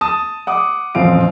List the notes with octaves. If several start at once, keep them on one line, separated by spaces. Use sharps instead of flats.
A5 D#6
F#5 D6 D#6
D#1 A1 F2 C5 F5 D7